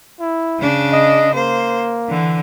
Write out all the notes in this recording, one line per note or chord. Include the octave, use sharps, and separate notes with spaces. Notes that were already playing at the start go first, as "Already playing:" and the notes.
E4
C#3 D4
D#5
A#3 C5
D3 E3